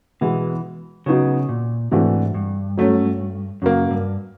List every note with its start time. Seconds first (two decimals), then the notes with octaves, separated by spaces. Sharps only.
0.21 B2 E3 G#3 B3 E4
1.06 C#3 F#3 B3 D#4 F#4
1.49 A#2
1.91 G#2 C3 E3 A3 D4 F#4
2.34 G2
2.77 F#3 A3 C#4
3.62 F#2 C#3 F#3 A#3
3.91 G2